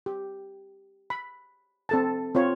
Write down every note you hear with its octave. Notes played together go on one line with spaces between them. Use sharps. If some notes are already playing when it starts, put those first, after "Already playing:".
G4
B5
C4 A4 A5
C4 F4 C#5